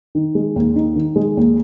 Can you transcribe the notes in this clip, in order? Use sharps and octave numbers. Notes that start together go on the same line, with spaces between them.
D#3
G#3
D#2
D#4
D#3
G#3
D#2